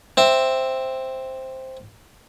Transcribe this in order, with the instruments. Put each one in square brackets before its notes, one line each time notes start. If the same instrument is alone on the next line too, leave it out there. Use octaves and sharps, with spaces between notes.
[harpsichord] C4 E5